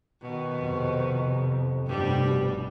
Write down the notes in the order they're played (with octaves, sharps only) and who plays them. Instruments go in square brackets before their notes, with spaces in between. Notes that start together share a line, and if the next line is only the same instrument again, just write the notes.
[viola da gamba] B2 D#3
[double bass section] F2 C3
[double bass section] F1 B2 [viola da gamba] G2 G3